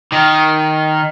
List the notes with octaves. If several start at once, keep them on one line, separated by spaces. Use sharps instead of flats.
D#3